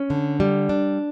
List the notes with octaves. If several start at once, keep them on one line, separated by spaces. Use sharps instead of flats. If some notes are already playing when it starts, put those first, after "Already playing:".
Already playing: C#4
D3
G3
D4